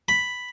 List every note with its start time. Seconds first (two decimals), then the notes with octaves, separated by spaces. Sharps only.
0.08 B5